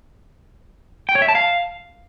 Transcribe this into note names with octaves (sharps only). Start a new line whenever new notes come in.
G5
C#5
E5
A5
F5